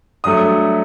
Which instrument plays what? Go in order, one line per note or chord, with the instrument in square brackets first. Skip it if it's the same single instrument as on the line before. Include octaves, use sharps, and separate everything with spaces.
[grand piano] G2 F#3 A3 D#6